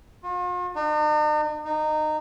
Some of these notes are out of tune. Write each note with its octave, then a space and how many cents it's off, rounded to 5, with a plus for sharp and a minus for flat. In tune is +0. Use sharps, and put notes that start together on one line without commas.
F4 +45
D#4 -45
D#4 -20